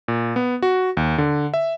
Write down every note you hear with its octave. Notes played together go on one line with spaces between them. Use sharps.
A#2
B3
F#4
D#2
D3
E5